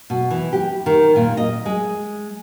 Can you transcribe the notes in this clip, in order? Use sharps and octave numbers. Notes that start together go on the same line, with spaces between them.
B2
E3
G4
D#3
A#2
D#5
G#3